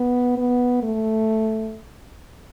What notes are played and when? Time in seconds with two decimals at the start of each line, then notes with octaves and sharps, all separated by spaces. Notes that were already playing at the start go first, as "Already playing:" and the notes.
Already playing: B3
0.37 B3
0.83 A3